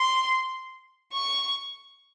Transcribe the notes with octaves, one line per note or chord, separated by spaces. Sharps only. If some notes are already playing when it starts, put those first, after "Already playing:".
Already playing: C6
C#6